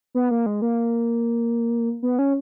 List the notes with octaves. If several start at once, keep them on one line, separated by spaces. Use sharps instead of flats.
B3
A#3
G#3
A#3
B3
C#4